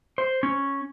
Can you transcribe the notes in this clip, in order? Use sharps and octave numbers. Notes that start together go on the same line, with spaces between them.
C5
C#4